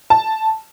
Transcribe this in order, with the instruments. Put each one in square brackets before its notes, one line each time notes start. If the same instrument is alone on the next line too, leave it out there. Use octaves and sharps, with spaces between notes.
[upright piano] A5